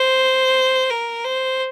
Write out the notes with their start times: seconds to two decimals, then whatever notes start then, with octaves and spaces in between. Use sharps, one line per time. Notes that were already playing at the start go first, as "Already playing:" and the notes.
Already playing: C5
0.90 A#4
1.24 C5